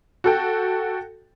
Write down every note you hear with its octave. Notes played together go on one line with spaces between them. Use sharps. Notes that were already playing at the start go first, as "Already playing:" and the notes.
F#4 A4 G5